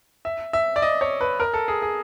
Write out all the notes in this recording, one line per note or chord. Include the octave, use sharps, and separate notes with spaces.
E5
E5
D5
D#5
C#5
B4
A#4
A4
G#4
G#4